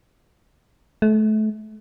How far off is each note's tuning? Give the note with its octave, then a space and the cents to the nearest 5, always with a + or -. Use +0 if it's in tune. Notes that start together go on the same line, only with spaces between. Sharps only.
A3 -30